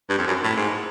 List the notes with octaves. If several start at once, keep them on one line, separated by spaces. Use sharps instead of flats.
G2
F2
F#2
A2
G#2